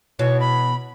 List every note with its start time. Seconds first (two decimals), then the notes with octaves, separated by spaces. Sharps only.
0.19 B2 E3 C#5
0.40 B5